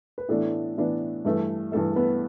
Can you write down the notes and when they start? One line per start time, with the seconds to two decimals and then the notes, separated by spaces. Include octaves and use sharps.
0.18 B4
0.29 A2 E3 A3 B3 D4 A4
0.77 A2 E3 B3 D4
1.25 G2 E3 A3
1.72 G2 E3 A3 A4
1.96 B3 B4